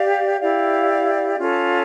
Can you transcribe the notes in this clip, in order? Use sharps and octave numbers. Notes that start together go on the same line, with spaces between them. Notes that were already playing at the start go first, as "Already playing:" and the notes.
Already playing: G4 D5 F5
E4 G4 D5 F5
C#4 F4 A4